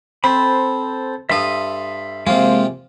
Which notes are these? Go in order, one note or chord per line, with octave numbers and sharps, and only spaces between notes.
C4 A4 C5 B5
G2 A4 E5 C6 D#6
C3 F3 G#3 A#3 C4 F4